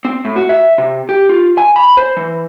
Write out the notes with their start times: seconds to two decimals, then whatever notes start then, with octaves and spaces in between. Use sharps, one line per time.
0.05 C4
0.25 A2
0.36 F#4
0.49 E5
0.78 C3
1.09 G4
1.29 F4
1.58 G#5
1.76 B5
1.97 C5
2.17 E3